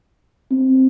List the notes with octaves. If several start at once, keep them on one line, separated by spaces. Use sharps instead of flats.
C4